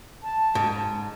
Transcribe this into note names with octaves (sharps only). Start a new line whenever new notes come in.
A5
G#2